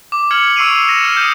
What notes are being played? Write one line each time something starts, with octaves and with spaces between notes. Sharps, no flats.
D6
F6 G#6 C#7 F#7
C#6 E6 C7 D7 D#7 F7
A#6 E7
F6 C#7 E7
D#6 G6